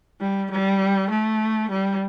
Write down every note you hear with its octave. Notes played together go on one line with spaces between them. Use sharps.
G3
G3
A3
G3